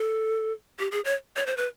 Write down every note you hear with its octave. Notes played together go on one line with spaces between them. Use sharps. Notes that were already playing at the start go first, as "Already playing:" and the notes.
Already playing: A4
G4
G#4
C#5
C#5
C5
B4